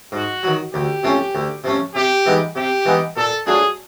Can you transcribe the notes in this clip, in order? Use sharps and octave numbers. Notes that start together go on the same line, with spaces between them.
G#2 F#4
D#3 F#3
D2 G4
C3 F3 A3 C#4
D2
C3 F3 A3 C#4
C3 G4
E3 G#3 B3 D#4
C3 G4
E3 G#3 B3 D#4
A#2 A4
F#3 A3 D4 F4 G#4